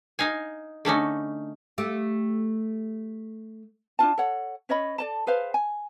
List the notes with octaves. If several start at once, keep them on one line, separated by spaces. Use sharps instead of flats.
D#4 F5 G#5
D3 A3 C#4 D#4
A3 G4
D4 E4 F4 A5
A4 C#5 F#5
C#4 C#5 D#5 B5
A4 D5 A5
G#4 B4 C5 F5
G#5